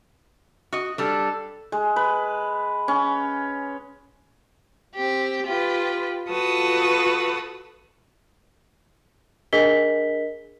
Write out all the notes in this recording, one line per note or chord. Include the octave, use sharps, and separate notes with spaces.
F#4 D#5
G3 D4 A4
G#3
B4
C#4
C4 G4
F4 G4 B4
F4 F#4 A4 B4 A5 D#6
D4 G#4 A#4 D#5 B6 G7